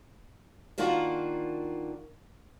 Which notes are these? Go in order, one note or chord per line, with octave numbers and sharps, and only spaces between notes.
D#3 A#3 D4 F4 F#4